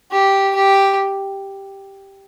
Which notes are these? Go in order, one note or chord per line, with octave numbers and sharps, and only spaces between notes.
G4
G4